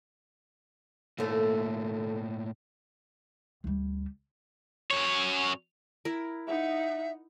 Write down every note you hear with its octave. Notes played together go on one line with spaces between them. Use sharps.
D#2 A2 A3 A#3
D2 G3
F#2 C#5
E4 A#4
D#4 E5 F#5